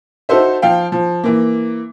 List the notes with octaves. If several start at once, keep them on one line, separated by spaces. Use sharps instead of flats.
D#4 F#4 A4 C5 E5
F3 F5 G5
F3
E3 A#3